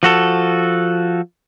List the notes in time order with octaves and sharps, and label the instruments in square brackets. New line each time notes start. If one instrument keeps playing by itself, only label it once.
[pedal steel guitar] F3 F#4 A4